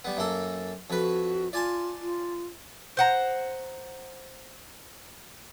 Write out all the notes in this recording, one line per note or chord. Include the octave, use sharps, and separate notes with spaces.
G3 B3
F#2 A#3 A4
F2 F#4 B4
F4 D5 G#5 A5
F4
C5 F#5 A#5